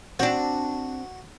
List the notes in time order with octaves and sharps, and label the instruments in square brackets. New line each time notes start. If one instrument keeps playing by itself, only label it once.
[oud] C4 D4 [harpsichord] F#4